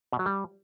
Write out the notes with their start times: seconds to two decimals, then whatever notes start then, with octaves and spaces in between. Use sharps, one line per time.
0.12 B2
0.19 F#3
0.26 G3